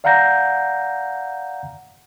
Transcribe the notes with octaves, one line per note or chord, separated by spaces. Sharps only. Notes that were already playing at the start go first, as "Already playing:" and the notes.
D5 F5 F#5 A#5 G6 A#6